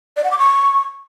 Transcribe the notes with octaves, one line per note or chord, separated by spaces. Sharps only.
D5
F#5
D6
C#6